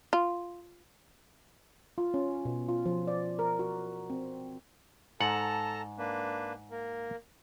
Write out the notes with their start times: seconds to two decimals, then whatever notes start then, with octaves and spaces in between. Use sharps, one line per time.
0.13 F4
1.98 F4
2.14 C#4
2.45 B2
2.69 F4
2.86 F3
3.07 D5
3.39 A#4
3.59 F#4
4.10 C4
5.20 G#2 A4 F#5 A5 A#5
5.98 A#3 D4 B4
6.71 A#3 A#4